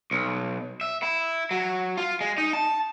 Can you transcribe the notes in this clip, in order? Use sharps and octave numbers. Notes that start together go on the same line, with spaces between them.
B1
E5
E4
F#3
F4
G#3
D#4
A5